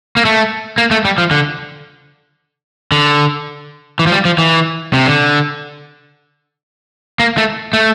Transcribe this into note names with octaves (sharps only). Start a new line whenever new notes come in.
A#3
A3
A#3
A3
G3
F3
D3
D3
E3
F3
G3
F3
E3
C3
D3
A#3
A3
A3